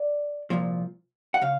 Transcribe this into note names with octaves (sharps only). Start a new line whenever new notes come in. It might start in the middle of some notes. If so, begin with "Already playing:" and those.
Already playing: D5
C2 A#2 F3
F#5
C#3 F5